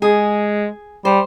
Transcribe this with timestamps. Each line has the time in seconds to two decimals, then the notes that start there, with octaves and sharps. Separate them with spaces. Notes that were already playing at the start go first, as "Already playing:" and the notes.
0.02 G#3 G#4
1.05 G3 C5